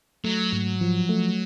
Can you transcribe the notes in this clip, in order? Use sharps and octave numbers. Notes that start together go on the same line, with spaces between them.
F#3 A3
G#2
F3
A3